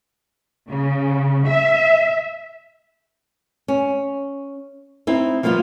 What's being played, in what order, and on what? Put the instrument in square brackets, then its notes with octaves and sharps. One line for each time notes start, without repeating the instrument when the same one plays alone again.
[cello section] C#3
E5
[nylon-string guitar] C#4
C4 D#4 E4
F3 G3 A#3 B3 F4